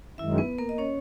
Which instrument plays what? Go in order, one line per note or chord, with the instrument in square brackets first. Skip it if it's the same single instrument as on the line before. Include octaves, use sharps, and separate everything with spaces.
[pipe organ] F#2 D#3 G#3 [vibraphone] E4 E5
[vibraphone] B3 B4
A#3 A#4
D#5
C#4 C#5